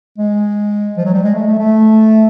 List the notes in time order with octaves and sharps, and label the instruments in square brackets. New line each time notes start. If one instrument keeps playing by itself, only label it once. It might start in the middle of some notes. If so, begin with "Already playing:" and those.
[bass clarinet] G#3
F3
F#3
G3
G#3
A3
A3
A3